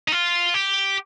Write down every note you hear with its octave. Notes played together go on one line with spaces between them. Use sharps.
D#4
F4
G4